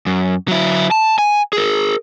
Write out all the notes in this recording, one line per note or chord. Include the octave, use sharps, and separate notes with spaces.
F#2
F#3 E4
A5
G#5
G#4 A#4